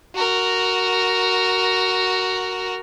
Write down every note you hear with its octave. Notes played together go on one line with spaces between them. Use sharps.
F#4 A#4